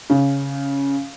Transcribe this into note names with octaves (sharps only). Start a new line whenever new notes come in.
C#3